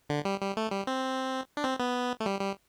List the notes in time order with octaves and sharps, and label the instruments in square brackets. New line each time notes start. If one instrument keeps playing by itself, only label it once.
[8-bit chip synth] D3
G3
G3
A3
G3
C4
D4
C4
B3
A3
G3
G3